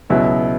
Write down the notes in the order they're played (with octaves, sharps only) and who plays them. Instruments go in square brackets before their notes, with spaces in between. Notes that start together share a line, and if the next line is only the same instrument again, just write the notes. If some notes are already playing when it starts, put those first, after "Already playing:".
[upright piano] C#2 B2 F#3 B3 E4